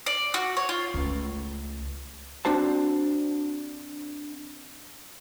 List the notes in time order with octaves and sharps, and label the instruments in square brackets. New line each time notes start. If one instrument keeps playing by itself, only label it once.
[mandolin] D5
F#4
C#5
F4
[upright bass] C#2 A3
[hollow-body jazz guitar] C4 D4 F#4 C5 A5